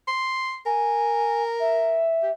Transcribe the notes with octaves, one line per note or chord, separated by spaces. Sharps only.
C6
A#4 G#5
E5
G4